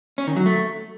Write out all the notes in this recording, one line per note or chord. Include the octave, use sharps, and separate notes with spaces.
C#4
D#3
F#3
A3